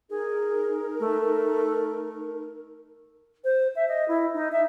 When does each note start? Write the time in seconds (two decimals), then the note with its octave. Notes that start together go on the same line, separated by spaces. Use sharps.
0.10 D#4 G#4 A#4
1.00 A3
3.44 C5
3.76 E5
3.88 D#5
4.08 E4
4.34 D#4
4.52 E5